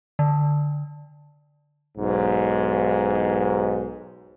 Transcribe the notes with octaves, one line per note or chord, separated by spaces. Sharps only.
D3
B1 G#2